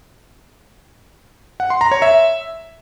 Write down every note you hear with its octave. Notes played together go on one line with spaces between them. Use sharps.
F#5
C6
A#5
C#5
E5